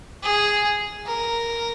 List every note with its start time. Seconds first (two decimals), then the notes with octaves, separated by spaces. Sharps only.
0.23 G#4
1.06 A#4